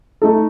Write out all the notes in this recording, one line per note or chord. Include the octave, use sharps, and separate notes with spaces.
A3 D#4 A4